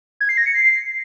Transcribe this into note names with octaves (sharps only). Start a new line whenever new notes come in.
G#6
C7
A#6
C#7
C7